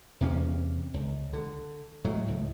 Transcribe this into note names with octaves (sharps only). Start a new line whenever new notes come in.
E2 C3 A#3 C#4
C#2
D3
A2 F#3 G#3 A3
C#2 A2